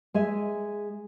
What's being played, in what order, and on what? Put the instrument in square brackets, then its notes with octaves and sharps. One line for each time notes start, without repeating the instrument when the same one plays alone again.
[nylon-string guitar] G#3 G#4 E5